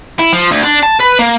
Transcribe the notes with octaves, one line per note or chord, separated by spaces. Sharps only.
E4
F3
D2
D4
A5
B4
A#3